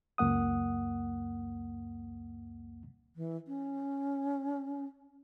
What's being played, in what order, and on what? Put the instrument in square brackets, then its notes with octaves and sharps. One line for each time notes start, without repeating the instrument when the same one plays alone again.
[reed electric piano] C#2 F#2 A#3 F#5 D#6
[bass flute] E3
C#4